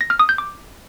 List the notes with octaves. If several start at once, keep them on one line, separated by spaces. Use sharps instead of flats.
A#6
F6
D#6
G6
D6